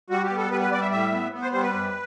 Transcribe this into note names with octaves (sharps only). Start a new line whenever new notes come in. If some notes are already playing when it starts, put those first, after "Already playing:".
G3 F#4
G4
B3
A4
G3 B4
B4
G3 D5
E5
A2 E5
B3
B3
C5
G3 C5
B4
F#2